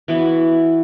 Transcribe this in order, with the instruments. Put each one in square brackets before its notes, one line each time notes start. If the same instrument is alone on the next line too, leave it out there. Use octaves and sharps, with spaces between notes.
[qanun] E3 B3 F#4